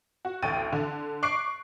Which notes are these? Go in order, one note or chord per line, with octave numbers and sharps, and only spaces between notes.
F#4
A1 D2 G5 A6 D#7
D3
C#6 D6 F#6 C7 D7